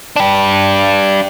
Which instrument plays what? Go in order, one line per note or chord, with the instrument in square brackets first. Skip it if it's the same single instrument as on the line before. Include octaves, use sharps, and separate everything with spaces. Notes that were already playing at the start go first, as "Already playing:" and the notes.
[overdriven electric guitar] D4 G4